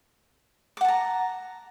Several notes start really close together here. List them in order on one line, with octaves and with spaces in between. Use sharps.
D6 F#5 A5 A#5